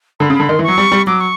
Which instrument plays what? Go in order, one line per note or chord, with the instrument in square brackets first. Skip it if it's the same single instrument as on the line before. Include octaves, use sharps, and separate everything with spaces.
[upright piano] D3 [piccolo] B5
[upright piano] C#3
[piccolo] B5
[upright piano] D3
[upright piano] D#3 [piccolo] C6
[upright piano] E3
[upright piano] F#3 [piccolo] C#6
[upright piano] G3
G3
[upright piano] F#3 [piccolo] D6
[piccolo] C#6